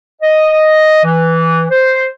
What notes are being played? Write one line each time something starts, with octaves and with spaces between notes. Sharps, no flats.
D#5
E3
C5